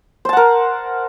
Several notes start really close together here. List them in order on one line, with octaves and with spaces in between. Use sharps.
C5 A5 F#5 A#4